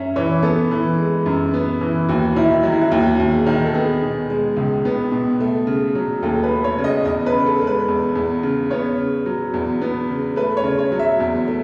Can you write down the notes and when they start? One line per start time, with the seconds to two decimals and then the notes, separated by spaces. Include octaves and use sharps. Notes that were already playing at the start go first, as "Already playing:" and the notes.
Already playing: F#2 C#4 E5
0.16 E3 C#5
0.43 B3 A4
0.71 E3
0.98 G#3
1.26 F#2
1.54 B3
1.81 E3
2.09 D#2 F#4
2.36 D#3 E4
2.63 F#3 F#4
2.72 E4
2.81 F#4
2.91 D#2 F#4
3.20 D#2
3.32 G#4
3.46 D#3
3.65 A4
3.75 B3 G#4
4.02 B2
4.30 G#3
4.57 C#2
4.85 B3
5.12 B2
5.40 A3
5.67 C#3
5.95 F#3
6.23 D#2 A4
6.43 B4
6.51 A3
6.64 C#5
6.78 C#3
6.84 D#5
7.05 E2 D#5
7.26 B4
7.33 C#3
7.46 A4
7.61 G#3
7.67 B4
7.88 E2
8.15 E2
8.43 C#3
8.70 B3 C#5
8.98 C#3
9.26 F#3
9.54 E2
9.81 B3
10.09 C#3
10.36 A3 B4
10.57 C#5
10.64 C#3
10.79 C#5
10.92 F#3
10.99 E5
11.20 E2
11.48 A3